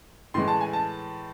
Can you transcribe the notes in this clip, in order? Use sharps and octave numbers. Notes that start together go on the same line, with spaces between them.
A2 E3 G#3 C6
A5
G#5
A5